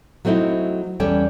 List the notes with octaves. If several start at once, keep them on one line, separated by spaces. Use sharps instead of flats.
F#3 A3 C4 D#4 E4
E2 G3 C#4 A4 C#5 G5